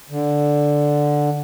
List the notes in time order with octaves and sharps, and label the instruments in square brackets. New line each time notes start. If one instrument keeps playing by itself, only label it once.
[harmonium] D3